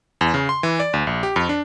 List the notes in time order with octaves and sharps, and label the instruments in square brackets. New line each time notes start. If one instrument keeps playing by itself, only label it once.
[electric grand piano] E2
C#3
C6
E3
D5
D2
A#1
G4
F2
D4